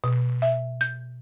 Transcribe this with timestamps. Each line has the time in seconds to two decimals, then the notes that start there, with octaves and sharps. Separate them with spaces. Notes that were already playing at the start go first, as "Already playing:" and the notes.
0.04 B2
0.42 E5
0.81 G6